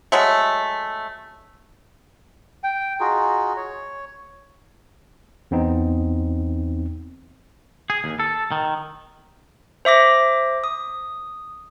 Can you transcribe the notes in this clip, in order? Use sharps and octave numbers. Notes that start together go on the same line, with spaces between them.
F#3 G#3 A3
G5
D#4 F4 F#4 G#4
C#5
E2 B3 C4 D#4
G#4
D#2
A4
D#3
C5 E5 D6 A#6
D#6